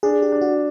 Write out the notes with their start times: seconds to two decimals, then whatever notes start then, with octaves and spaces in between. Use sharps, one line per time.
0.03 D4 G#4
0.22 G4
0.32 D4
0.41 F#4